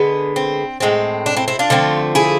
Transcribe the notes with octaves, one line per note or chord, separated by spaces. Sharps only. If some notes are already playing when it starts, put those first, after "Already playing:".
Already playing: D3 G#3 B3
C4
A2 G#3 C4
D4
C4 E4
C4 E4
D4 F4
D3 F3 A3 C4
E4 G#4